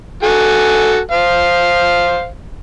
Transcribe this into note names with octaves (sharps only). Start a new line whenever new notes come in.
F#4 A4 G#5
C5 F5